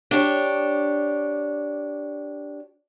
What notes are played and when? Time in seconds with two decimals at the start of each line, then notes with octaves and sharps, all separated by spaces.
0.11 D4 G4 C#5